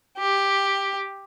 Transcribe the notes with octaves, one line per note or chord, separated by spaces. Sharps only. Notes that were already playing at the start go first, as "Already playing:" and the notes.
G4